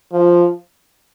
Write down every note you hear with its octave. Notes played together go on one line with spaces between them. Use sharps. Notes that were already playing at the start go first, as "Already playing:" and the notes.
F3